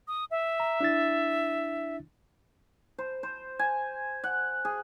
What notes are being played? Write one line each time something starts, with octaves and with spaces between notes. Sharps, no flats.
D#6
E5
A#5
D4 E4 A6
C5
C5
G#5
F#5
G#4